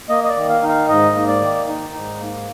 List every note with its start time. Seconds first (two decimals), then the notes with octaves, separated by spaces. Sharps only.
0.09 A#3 D#5
0.24 D#5
0.29 D5
0.36 D#3
0.49 F5
0.63 D#4
0.69 F5
0.88 G#2 D#5
1.15 A#3
1.28 D5
1.41 D#3
1.68 D#4
1.94 G#2
2.19 A#3